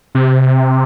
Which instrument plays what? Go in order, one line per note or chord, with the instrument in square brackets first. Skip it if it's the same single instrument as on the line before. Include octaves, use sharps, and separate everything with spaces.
[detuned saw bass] C3